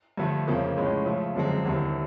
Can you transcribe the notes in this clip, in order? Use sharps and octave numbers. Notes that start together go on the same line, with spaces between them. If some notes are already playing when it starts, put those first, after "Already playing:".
G2 D3 F3 A3
F2 C#3 F3 A#3
A2 F3 G#3 C#4
C#3 F3 A3
F#2 D3 F3 G#3 C4
D#2 D3 G3 C4 E4